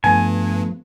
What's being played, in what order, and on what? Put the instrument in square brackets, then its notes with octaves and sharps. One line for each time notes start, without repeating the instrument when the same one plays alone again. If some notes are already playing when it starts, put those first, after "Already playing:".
[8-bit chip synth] G2 [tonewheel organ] F3 A3 B3 [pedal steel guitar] G#5